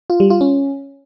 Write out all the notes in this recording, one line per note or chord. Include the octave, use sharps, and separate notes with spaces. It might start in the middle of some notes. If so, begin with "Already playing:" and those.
F4
G3
F4
C#4